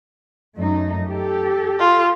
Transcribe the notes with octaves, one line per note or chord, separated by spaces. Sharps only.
F#2 A3 D#4
G4 A4
F4